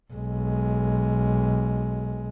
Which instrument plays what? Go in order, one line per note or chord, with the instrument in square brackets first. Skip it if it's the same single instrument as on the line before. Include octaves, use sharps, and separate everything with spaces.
[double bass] B1 G#3